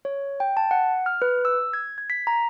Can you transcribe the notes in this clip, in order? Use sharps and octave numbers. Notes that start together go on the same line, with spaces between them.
C#5
G5
A5
F#5
F6
B4
E6
G#6
G#6
B6
A#5